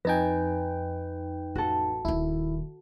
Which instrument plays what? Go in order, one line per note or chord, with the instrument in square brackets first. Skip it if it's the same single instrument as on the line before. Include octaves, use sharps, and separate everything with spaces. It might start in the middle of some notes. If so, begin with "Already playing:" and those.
[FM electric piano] F2 D#4 G5 [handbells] B4 [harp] G#5 A6 A#6
[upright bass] A1 [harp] F#4 A4
[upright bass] D#1 D#3 [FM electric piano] E4